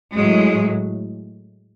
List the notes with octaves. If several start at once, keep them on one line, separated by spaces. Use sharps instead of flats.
A2 F#3 G#3